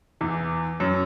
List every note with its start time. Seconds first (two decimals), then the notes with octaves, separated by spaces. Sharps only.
0.21 E2 E3
0.80 F#2 F#3